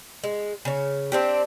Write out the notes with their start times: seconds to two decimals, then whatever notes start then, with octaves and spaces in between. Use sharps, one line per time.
0.24 G#3
0.65 C#3 C#5
1.12 C4 D4 G4